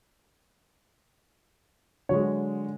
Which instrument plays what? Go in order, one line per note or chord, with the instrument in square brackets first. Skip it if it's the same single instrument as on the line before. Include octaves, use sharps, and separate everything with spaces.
[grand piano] D3 G#3 [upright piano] F#3 C#5